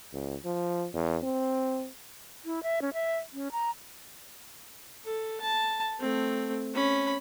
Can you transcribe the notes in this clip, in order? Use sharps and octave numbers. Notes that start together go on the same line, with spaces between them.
C#2
F3
E2
C4
E4
E5
C#4
E5
C#4
A#5
A4
A5
A3 C4
C#4 B5